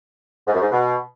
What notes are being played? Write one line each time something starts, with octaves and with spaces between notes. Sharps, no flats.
G#2
F#2
G#2
B2